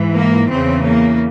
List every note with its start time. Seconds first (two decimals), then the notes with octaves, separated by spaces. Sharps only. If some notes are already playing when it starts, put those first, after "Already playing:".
Already playing: G#2 E3
0.13 A#3
0.49 E2 C#3 E3 C4
0.85 A#3